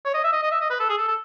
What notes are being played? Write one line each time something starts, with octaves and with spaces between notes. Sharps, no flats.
C#5
D#5
E5
D#5
D#5
E5
D#5
B4
A4
G#4
A4
A4